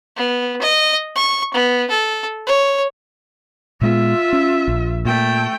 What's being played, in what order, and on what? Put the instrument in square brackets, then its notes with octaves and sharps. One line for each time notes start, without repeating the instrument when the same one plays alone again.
[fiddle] B3
D#5
C#6
B3
A4
C#5
[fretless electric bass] A#2 G#3 B3 [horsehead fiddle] F4 E5
[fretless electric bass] C#4
A#1
[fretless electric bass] A#2 [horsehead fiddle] A3 G5